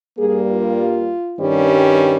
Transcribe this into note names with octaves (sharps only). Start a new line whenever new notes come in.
G2 G3 A#3 G#4
F4
G2 D#3 G3 C#4